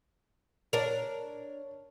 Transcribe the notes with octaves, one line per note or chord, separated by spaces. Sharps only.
D4 A#4 C#5 A5